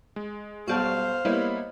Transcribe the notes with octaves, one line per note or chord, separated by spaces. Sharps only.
G#3
B1 G3 F#4 C5 F5 A5
G3 A#3 B3 E4 C#5 D#5